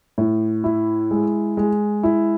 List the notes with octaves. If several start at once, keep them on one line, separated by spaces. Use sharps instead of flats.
A2
E4
G#3
G#3
E4